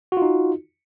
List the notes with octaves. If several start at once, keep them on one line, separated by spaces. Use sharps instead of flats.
D#4 F4 F#4